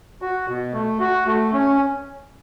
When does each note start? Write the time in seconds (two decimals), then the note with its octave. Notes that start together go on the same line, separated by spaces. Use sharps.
0.22 F#4
0.48 B2
0.74 A3
1.00 F#4
1.26 A3
1.53 C#4